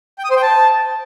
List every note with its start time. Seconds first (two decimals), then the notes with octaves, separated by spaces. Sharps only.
0.18 G5
0.24 D#6
0.30 C5
0.36 G5
0.43 A5